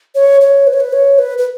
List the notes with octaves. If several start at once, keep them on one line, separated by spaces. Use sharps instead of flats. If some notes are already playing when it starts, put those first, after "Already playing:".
C#5
C#5
B4
C#5
B4
C#5
B4
B4